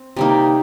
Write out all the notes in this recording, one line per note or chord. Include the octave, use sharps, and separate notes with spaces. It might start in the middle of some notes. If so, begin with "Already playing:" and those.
Already playing: C4
C3 G3 A#3 D#4